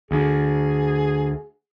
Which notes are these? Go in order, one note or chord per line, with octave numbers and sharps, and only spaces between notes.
D2 G#4